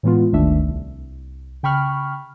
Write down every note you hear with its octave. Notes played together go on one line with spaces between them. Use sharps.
A2 E3 G#3 B3 F4
G1 D2 D#3 A3 D4 E5
C2
C#3 G5 B5 C#6 F6